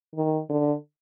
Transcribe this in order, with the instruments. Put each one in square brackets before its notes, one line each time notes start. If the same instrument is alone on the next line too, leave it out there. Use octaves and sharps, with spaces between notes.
[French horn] D#3
D3